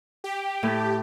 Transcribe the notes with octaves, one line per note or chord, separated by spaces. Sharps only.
G4
A2 A5